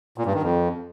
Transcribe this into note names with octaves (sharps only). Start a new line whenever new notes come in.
A#2
G2
D#3
F2